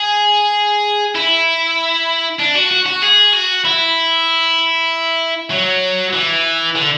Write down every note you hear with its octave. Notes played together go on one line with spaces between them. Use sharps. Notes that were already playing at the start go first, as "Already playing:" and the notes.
Already playing: G#4
E4
D4
F#4
F#4
F#4
G#4
F#4
E4
F#3
E3
D3